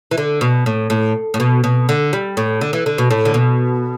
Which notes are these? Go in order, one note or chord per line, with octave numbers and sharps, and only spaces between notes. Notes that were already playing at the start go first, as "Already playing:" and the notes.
E3
D3
B2
A2
A2
A2
B2
B2
D3
G3
A2
D3
E3
D3
B2
A2
D3
B2